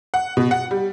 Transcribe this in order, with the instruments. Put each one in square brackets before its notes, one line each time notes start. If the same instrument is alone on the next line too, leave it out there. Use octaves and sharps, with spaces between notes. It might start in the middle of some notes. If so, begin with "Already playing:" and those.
[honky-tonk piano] F#5
B2
F#5
G3